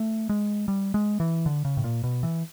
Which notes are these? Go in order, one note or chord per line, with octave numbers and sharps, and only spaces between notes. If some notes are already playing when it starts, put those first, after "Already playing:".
Already playing: A3
G#3
G3
G#3
E3
D3
C#3
A2
A#2
B2
E3